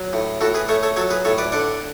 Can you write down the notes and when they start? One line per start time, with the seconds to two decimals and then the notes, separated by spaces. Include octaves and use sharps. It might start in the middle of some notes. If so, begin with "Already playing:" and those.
Already playing: F#3
0.13 A2
0.41 A2 F#4 A4
0.55 G#4 B4
0.68 A3 A4 C#5
0.83 A4 C#5
0.96 F#3 A4 C#5
1.10 G#4 B4
1.25 A2 A4 C#5
1.38 B4 D5
1.52 D3 D5 F#5